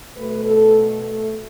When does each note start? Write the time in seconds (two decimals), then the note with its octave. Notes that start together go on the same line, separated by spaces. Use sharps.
0.17 B2 A3 B4
0.45 A4
1.02 A3